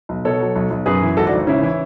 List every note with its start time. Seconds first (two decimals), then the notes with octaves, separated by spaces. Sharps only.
0.09 B1
0.25 B2 A4 C#5
0.41 F#3
0.56 B1
0.70 B1
0.86 F#2 G#4 B4
1.02 E3
1.17 G#1 F#4 A4
1.27 D4 F#4
1.33 G#1
1.47 C#3 C#4 E4
1.63 E3